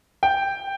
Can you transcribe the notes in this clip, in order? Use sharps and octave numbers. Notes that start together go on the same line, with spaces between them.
G5